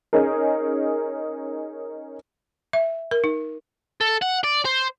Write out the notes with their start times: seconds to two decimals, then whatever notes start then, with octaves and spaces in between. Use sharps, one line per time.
0.13 C#4 D#4 G#4 A#4
2.73 E5
3.11 A#4
3.24 D#4
4.01 A4
4.22 F#5
4.44 D5
4.65 C5